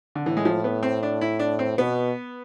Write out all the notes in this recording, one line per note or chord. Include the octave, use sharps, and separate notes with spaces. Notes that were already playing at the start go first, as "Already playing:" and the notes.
D3
A2 E3
G#3
F3
B3
C4
D4
E4
D4
C4
B2 B3